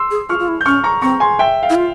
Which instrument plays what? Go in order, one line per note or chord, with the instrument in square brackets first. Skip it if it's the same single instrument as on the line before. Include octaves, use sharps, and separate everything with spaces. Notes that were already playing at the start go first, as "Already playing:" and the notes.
Already playing: [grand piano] C6 E6
[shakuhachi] G#4
[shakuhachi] F4 [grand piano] C#6 F6
[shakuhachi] F4
E4
[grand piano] G6
[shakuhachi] C#4 [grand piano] C#6 F6
[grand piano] A#5 C#6
[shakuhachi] C4 [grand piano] A#5 C#6
[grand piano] G#5 C6
E5 G5
F5
[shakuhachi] E4
F4